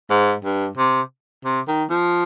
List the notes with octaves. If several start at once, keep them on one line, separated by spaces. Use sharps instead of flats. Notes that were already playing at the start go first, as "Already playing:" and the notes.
G#2
G2
C3
C3
D#3
F3